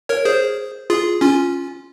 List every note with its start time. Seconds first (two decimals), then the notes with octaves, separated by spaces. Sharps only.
0.09 A#4 C#5
0.25 G#4 C5
0.90 F4 G#4
1.21 C#4 F4